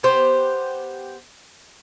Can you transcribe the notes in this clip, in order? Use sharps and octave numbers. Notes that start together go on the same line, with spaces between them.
B3 G4 C5